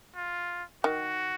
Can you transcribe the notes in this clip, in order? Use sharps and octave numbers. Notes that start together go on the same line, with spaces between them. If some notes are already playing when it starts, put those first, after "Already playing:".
F4
D#3 F#4